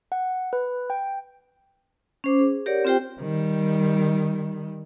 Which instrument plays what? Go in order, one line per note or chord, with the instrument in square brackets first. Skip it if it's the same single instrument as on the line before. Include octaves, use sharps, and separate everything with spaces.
[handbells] F#5
B4
G5
[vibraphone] C#4 C5 D6
G#4
G4 A#4 C#5 D5 F#5
C4 F4 G4 C5 G5
[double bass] D#3 G3